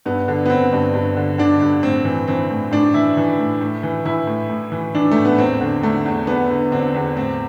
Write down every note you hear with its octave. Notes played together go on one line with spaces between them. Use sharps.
G2 B3
D3
B3
D3 C4
G2
G2
D3
D3 D4
G2
A2 C4
E3
E3 C4
A2
A2 D4
E3 E4
E3
A2
A2
E3
E3 E4
A2
A2
E3
E3 D4
A2 A3
B3
E2 C4
D3
D3 A3
E2
E2 B3
D3
D3 C4
E2
A2 C4